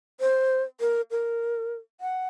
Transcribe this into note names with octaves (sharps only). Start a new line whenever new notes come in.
C5
A#4
A#4
F#5